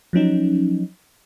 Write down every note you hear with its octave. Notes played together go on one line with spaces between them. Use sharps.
F3 F#3 C#4 D#4